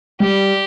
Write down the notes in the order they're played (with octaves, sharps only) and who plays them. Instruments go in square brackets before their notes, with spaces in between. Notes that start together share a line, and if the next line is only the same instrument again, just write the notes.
[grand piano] G3 [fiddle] G4